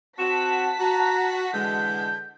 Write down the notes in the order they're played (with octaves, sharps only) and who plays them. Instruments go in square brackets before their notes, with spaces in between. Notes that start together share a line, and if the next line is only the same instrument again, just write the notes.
[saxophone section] C4 F#4 [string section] F#5 A5 B6 [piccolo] E7
[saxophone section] F#4 [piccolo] A#5
[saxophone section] D3 E3 G#3 [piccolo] G6